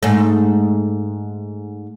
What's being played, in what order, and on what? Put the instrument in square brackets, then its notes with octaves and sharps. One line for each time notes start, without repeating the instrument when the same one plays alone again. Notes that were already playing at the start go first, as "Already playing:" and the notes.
[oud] G#2 A3